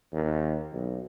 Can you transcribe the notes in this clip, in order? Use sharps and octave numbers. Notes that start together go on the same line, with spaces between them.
D#2
B1